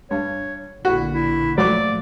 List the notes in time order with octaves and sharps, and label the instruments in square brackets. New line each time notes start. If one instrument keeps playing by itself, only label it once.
[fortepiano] G2 [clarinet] C#5
[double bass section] A#1 A#2 D3 [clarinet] E4 [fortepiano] F#4
[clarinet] E4
[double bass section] A#2 F3 A3 [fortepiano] F#3 D6 [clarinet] D5